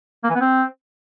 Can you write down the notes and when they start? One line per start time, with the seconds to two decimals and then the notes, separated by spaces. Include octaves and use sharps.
0.24 A#3
0.30 E3
0.35 B3
0.41 C4